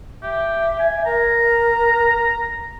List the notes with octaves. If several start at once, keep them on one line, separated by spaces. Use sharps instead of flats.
G4 E5
G#5
A#4 A#5